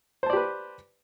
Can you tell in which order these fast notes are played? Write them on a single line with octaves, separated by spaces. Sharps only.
C5 A5 D5 G4 B4